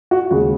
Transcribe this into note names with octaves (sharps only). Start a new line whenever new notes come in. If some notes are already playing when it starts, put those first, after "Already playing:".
F#4
D#2 C#3 G#3 F#4